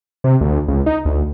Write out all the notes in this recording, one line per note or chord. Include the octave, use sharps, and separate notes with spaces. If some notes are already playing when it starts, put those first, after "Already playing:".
C3
D2
C#2
D#4
D2